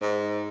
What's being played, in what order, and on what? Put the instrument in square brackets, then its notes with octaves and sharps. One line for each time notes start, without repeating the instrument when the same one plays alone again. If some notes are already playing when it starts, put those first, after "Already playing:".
[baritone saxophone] G#2